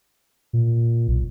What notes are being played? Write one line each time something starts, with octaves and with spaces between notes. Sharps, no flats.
A#2
B1